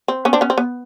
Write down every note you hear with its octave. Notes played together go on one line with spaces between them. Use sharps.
C4
B3 C#4
C4 D4
B3 C#4
C4
B3